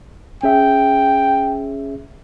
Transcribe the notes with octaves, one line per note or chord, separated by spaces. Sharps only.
C#4 G#4 E5 G5